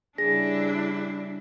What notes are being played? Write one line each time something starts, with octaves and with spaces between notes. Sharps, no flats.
C#3 G3 D4 E4 G#4 A#6